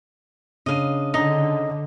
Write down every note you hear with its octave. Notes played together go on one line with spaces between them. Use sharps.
C#3 D4 D#5 F5 D#7
D3 D#4 D#5